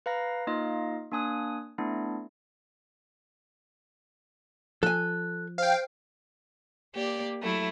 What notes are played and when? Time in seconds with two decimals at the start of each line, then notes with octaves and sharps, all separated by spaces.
0.06 B4 F5 A#5 A#6
0.47 A#3 D#4 F4 D#5 F5
1.11 A#3 D4 G#5 D#6 F#6
1.78 A3 B3 D4 E4
4.83 F3 A4 G#5 F#6
5.58 C5 F5 G5
6.94 A#3 G4 D5
7.41 F#3 A3 E4